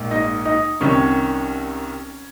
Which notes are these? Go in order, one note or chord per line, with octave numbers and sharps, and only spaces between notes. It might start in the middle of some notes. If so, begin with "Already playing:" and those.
Already playing: A#1 G#2 A#3
D#4 D#5
D#4 D#5
C2 C3 D#3 C#4 C#5